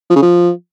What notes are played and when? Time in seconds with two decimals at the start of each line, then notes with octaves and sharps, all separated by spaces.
0.10 F3
0.16 C#3
0.22 F3